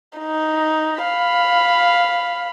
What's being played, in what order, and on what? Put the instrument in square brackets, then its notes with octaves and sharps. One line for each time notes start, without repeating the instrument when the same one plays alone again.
[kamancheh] D#4
F5 B5